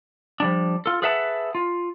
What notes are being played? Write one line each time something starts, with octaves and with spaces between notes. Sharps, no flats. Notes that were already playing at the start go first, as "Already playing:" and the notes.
F3 G3 D4
F4 A4
G#4 A4 B4 E5 F#5 A5
F4